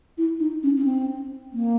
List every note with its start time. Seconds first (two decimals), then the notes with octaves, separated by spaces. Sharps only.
0.18 E4
0.40 D#4
0.63 C#4
0.78 C#4
0.85 C4
1.53 A#3